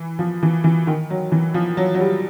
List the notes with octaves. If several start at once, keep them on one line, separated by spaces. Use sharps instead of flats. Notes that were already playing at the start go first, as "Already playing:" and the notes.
Already playing: E3
F3
E3
E3
D#3
F#3
E3
F3
F#3
F#3
G3